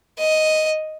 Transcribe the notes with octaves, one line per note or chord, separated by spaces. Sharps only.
D#5